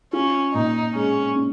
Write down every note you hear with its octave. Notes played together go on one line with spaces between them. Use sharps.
C#4 F4
A#2 D#4
G#3 C#4
C#4